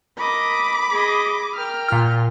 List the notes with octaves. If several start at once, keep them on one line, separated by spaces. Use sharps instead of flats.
A#4 D#5 B5 D6
G#4 D#5
A#4 G5 F6
A#2 F4 F6